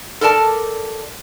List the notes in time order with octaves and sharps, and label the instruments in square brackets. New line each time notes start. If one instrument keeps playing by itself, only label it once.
[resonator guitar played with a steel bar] A4 A#4 D5 A5